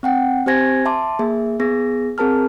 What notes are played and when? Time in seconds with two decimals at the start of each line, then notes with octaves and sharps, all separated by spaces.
0.03 C4 F#5 G5
0.46 C4 G4 C5 G#5 G#6 A#6
0.85 E5 A5 C6 D6
1.19 A#3 G#4 E5
1.60 B3 G#4 A#6
2.18 C4 G#4 A#4 A5 F6